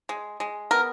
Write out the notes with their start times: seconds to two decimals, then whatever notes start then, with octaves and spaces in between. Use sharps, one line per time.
0.09 G#3
0.40 G#3
0.71 B3 A#4